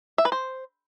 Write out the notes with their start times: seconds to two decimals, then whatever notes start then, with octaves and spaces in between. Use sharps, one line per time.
0.18 E5
0.25 B4
0.32 C5